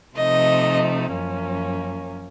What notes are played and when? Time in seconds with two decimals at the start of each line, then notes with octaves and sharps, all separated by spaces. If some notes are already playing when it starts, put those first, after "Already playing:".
0.17 C3 F3 A3 D#4 D#5
1.13 F#2 F3 A#3 C#4